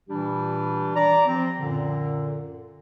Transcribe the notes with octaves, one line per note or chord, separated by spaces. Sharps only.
A#2 E3 G3 D4 G4
D5 A#5
F3 C4
F#2 A#2 D3